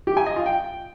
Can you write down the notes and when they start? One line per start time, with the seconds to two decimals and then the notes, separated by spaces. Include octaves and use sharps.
0.07 G4
0.17 G#5
0.26 D#5
0.36 F4
0.46 G5